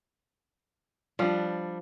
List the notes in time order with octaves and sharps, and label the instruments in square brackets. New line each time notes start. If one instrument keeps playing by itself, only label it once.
[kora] F3 [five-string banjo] G3 D4